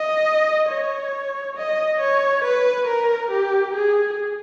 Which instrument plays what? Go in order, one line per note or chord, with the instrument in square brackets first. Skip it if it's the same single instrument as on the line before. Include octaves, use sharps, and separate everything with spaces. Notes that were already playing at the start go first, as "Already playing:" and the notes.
Already playing: [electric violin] D#5
C#5
D#5
C#5
B4
A#4
G4
G#4